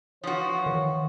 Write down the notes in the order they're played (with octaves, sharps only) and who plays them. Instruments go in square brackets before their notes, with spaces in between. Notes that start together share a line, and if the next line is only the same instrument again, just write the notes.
[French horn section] E3 C#5 [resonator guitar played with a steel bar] F3 F#4
[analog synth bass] D#3